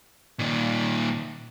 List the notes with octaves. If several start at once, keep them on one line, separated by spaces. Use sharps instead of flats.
A#2 D#3